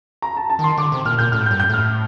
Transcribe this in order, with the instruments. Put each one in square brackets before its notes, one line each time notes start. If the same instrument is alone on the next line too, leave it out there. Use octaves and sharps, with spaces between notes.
[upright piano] A#5
A5
A5
[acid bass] D#3 [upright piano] C6
[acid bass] D3 [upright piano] D6
[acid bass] C3
[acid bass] A#2 [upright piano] F6
[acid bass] A#2 [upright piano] G6
[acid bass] A2 [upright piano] F6
[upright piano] G6
[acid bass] G2
[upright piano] G6
[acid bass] A2 [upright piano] F6